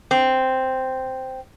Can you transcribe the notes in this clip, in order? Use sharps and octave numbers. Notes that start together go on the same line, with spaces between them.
C4